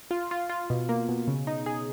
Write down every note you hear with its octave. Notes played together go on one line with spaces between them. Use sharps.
F4
F4
F4
B2
A#3
B2
C#3
D#4
G#4